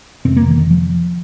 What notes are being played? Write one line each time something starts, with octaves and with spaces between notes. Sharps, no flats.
F2 C3 C4
A#3
D#3
D#3
F3